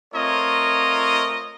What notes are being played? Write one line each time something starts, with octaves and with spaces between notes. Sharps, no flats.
A3 C4 F4 A#4 C#5 D#5